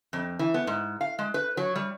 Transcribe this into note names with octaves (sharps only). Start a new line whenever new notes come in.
F2
E3
B3
G#2
F5
G#3
B4
F#3
G3